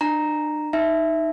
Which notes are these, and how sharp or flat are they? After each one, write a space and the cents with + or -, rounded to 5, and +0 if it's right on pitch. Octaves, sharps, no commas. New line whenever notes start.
D4 +40 A#5 +0
D#4 +0 E5 +5